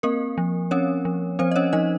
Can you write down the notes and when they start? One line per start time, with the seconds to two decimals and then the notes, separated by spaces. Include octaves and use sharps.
0.03 A#3 C4 A#4
0.38 F3
0.71 C4 C#4 C#5
1.05 F3
1.39 F3 C4 C5
1.51 D#5
1.56 C#4 C#5
1.73 F3 D#4 D#5